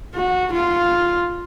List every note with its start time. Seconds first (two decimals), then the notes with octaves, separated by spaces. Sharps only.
0.15 F#4
0.52 F4